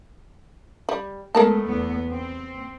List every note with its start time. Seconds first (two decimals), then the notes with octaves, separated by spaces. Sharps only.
0.89 G3
1.35 G#3 A3 B3 G#4 A#4 A5
1.66 E2 B3
2.10 C4